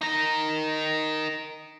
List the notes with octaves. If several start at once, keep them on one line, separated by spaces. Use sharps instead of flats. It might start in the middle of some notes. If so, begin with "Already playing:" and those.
D#4 A#4